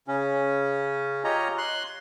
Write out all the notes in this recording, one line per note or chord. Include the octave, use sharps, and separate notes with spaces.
C#3 C#4
F4 G4 C#5 D#5 A#5
C6 F#6